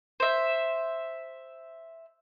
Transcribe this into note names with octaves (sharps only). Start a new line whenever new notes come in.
C5 E5